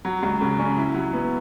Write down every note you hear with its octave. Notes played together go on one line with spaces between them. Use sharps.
F#3
C#2
C#3
C#4
E4
F#3
B3